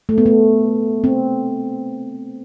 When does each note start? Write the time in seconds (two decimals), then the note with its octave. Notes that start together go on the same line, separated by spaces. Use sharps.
0.09 A3
0.18 B3
0.26 A3
1.04 C4